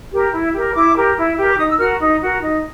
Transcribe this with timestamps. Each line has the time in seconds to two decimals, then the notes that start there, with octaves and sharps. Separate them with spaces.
0.12 G4 A#4
0.32 E4
0.53 G4 A#4
0.74 E4 D6
0.96 G4 A#4
1.17 E4
1.37 G4 A#4
1.52 D6
1.58 D#4 D#6
1.68 E6
1.78 F#4 A#4 F6
2.00 D#4
2.21 F#4 A#4
2.41 D#4